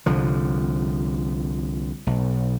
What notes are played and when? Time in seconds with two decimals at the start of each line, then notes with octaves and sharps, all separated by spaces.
0.06 C2 D3 F3
2.07 B1